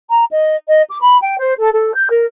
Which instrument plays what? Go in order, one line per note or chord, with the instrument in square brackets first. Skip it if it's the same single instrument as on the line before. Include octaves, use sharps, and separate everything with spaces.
[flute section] A#5
D#5
D#5
D6
B5
G5
C5
A4
A4
G6
A#4